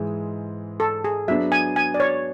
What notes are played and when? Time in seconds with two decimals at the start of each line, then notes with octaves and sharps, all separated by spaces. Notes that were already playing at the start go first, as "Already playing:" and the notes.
Already playing: G#2 E3 G#3
0.80 A4
1.04 G#4
1.28 F#3 B3 D4 E5
1.52 G#5
1.76 G#5
1.94 D5
2.00 C#5